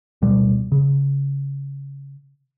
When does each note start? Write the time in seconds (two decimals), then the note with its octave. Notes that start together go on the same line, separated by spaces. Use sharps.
0.22 D1 B2 G3
0.72 C#3